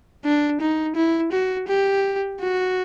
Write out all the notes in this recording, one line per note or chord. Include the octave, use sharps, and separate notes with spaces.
D4
D#4
E4
F#4
G4
F#4